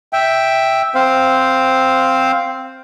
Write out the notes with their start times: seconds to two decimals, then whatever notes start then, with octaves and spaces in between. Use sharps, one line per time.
0.13 E5 G5
0.95 C4 C5 F5